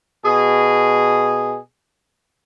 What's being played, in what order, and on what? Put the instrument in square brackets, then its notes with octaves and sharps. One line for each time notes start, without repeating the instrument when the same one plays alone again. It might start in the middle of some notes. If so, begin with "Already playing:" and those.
[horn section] B2 G#4